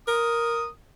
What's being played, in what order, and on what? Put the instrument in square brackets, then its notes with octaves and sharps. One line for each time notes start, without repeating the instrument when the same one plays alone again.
[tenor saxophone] A#4 [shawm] D#6